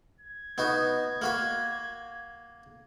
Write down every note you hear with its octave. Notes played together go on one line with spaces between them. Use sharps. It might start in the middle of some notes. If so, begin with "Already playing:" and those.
G#6
B3 D#4 F#4
A#3 F#4 B5